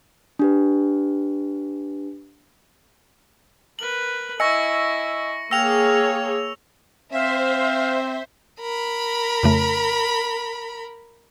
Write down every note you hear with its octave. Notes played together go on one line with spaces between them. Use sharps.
D4 G4 B4
A#4 B4 F#7
E4 D#5 G#5 C#6 E6 A#6 C#7
A#3 G#4 C#5 F5 G5 E6 A#6 F7
C4 C5 E5 F5
A#4 B5
F2 C#3 A3